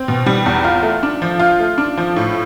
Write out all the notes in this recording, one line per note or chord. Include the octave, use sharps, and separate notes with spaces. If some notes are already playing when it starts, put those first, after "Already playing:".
Already playing: C4
B2
G3
E2
F4
A3
D4
F3
F4
A3
D4
F3
A2